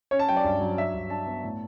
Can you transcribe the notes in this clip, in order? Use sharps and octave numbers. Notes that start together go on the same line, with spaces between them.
C#4 C#5
A5
F#3 G5
D5
G2
F#3
D4 E5
G2
D4 A5
B3
A2